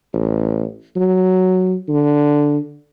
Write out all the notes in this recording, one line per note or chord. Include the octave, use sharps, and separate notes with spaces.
A1
F#3
D3